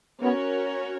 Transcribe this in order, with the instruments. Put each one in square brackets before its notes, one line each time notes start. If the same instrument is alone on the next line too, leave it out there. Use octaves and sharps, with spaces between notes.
[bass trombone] B3 [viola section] C#4 F#4 A#4 C#5